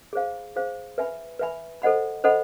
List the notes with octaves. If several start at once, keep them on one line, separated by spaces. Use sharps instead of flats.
G#4 C5 F5
G#4 C5 F5
B4 E5 G#5 B5
B4 E5 G#5 B5
A4 C5 D#5 F#5 B5
A4 C5 D#5 F#5 B5